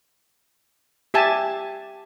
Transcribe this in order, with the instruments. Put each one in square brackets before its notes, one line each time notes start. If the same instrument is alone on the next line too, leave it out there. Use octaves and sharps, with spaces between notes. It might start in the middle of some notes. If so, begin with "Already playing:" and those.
[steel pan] G4 E5 G#5 A5